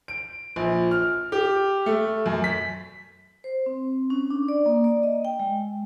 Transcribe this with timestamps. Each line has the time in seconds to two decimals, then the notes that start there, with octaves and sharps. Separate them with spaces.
0.08 D7
0.56 A#1
0.91 F6
1.32 G4
1.86 A3
2.26 F#2
2.44 B6
3.44 C5
3.66 C4
4.10 C#4
4.30 D4
4.48 D5
4.66 A#3
4.84 D5
5.03 D#5
5.25 G5
5.40 G#3